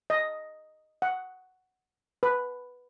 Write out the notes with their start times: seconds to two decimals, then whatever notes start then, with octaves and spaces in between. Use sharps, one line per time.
0.10 D#5
1.02 F#5
2.23 B4